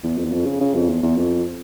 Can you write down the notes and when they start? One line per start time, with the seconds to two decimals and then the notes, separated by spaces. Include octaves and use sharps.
0.04 E2
0.18 F2
0.25 E2
0.33 F2
0.46 C#3
0.61 C#3
0.75 F2
0.89 E2
1.03 E2
1.18 F2